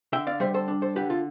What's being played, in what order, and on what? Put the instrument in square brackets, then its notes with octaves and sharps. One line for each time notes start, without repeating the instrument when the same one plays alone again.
[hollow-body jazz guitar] D3 E5 G5
D5 F5
G3 C5 E5
A4 C5
D4
A4 C5
D3 G4 B4
F4 A4